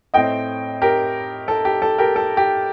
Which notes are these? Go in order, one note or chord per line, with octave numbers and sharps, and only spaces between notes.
A2 A3 C4 D#5 G5
G4 A#4
A4
G4
A4
G4 A#4
A4
G4